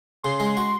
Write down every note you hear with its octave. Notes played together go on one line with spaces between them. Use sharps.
C#3 C6
G#3
F#4